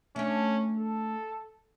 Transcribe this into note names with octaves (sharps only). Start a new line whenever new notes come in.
A3 C#4 D4
A4